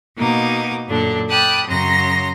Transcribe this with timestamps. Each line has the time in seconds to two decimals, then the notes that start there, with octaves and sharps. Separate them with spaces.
0.17 B2 A#3 D#4 D6
0.88 F#2 A#2 D3 D4
1.30 G5 A5 B5 D6 D#6 F#6
1.67 F#2 C#3 A#5 C6 A#6